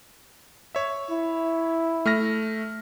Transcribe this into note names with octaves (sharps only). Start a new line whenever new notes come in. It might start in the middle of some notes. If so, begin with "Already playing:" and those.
C#5 E5
E4
A3 F6 A#6